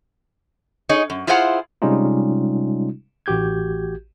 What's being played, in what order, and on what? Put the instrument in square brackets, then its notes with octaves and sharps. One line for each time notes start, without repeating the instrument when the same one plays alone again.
[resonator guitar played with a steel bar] D#4 G#4 C#5 D#5
F#2
E4 F4 G#4 C5 F5 F#5
[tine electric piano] C3 G3 G#3 C#4 D#4 F4
A1 F#4 G4 G6 G#6